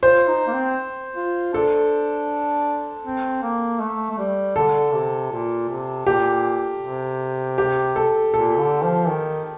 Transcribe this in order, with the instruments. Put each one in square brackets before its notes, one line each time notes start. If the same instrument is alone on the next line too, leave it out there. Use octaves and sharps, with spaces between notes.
[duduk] F4 [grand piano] C5
[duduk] D#4
A#3
C4
F4
[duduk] D4 [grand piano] A4
[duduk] C4
A#3
A3
A3
G3
[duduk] D3 [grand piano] A4
[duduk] C3
A#2
C3
[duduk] A#2 [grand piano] G4
[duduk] C3
[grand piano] G4
A4
[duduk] A#2 [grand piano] A4
[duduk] D3
F3
D#3